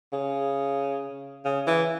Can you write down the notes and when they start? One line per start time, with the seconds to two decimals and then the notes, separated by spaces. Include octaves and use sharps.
0.13 C#3
1.45 C#3
1.67 E3